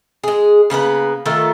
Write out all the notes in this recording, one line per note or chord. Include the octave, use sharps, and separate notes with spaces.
G#3 G#4
C#3 A#3 B3 B4
D#3 A3 F4 A4